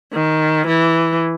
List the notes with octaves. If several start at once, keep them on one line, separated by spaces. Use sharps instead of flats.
D#3
E3